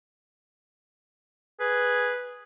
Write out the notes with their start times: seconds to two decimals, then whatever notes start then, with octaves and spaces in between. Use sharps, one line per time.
1.60 G#4 B4